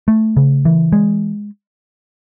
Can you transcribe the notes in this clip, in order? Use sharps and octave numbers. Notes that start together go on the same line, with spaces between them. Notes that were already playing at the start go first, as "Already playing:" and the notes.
A3
C#3
E3
G#3